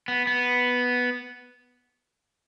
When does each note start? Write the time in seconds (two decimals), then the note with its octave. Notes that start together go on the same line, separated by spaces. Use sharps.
0.08 B3
0.27 B3